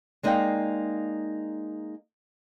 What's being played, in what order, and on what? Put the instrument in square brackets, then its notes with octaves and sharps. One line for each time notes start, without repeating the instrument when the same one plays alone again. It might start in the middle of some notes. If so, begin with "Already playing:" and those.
[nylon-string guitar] G#3 A#3 D#4 D5 F5 G5